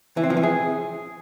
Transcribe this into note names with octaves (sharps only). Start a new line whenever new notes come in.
E3
C4
F3
E3
G#4